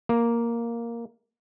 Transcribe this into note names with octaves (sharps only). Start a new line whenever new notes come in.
A#3